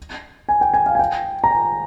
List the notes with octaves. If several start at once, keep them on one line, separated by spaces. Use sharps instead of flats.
G#5
G5
G#5
F5
G#5
G5
A#5
G#5